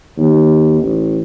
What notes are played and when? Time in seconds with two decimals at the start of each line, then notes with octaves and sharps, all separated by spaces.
0.18 D#2
0.81 A1